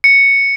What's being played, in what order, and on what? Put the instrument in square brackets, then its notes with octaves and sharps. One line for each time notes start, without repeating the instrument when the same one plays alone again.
[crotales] C#7